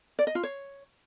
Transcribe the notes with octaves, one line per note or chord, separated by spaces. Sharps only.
D5
D#5
F4
C#5